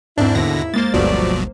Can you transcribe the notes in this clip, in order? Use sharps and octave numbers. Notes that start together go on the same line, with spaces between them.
E2 G#2 C4 D4 E4
D#2 B2 D3 A#6
G#3 A#3 C5 A6
G1 D2 G2 B2 F3 F#3 A3 D5